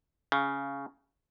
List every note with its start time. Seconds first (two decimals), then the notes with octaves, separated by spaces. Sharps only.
0.32 C#3